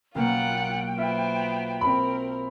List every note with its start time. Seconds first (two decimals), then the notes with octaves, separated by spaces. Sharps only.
0.15 B1 A#3 F4 F#5 G5
0.97 B3 F4 C5 E5
1.81 C4 A#4 B5